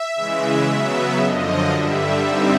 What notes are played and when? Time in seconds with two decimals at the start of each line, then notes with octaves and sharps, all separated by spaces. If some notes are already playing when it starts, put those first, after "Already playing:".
Already playing: E5
0.15 C#3 E3 G#3
0.67 C#3 F#3 B3 E5
1.19 F#2 D3 F3 D#5
1.72 G2 D3 G3 E5
2.24 G2 D3 G3 C4 D#4